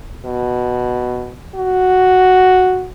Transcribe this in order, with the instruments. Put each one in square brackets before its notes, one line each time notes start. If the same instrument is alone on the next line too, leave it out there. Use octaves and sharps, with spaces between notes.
[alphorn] B2
F#4